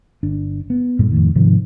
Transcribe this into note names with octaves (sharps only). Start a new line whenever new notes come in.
G1 D4
B3
G2 A#2 G3
F2 A2 D#3
G#2 C3 D#3 F3